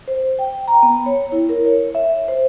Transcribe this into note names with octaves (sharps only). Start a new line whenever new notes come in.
C5
G5
A#5
B3
C#5
E4
A#4
C#5
E5
C5